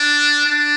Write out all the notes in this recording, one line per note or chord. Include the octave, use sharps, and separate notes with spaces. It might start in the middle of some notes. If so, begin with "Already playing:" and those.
Already playing: D4
D4